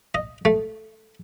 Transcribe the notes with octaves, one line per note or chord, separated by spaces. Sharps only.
D#5
A3